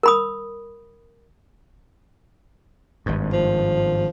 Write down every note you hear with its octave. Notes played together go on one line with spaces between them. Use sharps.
A#4 B5 D#6
G#1 G2
F3